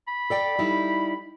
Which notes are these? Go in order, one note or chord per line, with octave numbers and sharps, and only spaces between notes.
B5
A4 D5 G5
G3 D#4 E4